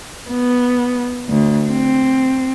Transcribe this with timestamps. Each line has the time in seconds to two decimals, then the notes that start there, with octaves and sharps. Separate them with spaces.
0.30 B3
1.29 D2
1.70 C4